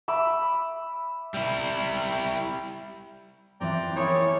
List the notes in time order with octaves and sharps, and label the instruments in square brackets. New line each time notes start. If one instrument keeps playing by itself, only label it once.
[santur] E5 B5 D6
[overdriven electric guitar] G3 E4
[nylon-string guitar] E3 F3 C4 [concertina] D5 G5 A#5
[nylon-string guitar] E4 [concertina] G#4 A#4 D5 [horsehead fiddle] C#5